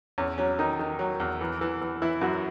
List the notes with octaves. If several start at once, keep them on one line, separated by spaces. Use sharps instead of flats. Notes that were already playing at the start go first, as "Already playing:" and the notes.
E2 C#4
F#3 C#4
D#3 D#4
D#3
F#3
E2
E3
E3
E3
E3 E4
F#2 F#4